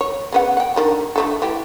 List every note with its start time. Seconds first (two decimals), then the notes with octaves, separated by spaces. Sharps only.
0.01 C#5
0.32 C#3 B3 F#5
0.57 F#5 G5
0.76 D3 D#3 G3
1.16 D3 A3 A4
1.42 E3 A3 G4